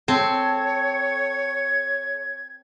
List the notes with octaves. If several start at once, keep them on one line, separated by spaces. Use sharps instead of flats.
C4 A4 C#5 G#6